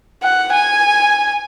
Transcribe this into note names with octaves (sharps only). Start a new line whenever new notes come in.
F#5
G#5